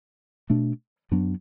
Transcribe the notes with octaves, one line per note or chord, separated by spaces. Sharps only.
B2 A3 D4
F#2 F#3 B3 D4